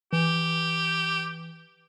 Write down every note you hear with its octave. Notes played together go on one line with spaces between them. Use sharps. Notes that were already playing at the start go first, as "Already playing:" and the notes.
E3 G4